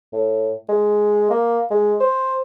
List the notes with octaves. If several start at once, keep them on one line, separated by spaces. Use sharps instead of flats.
A2
G#3
A#3
G#3
C5